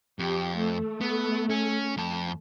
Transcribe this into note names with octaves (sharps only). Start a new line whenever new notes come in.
F2 G4
A3
B3
C#4
F2 A5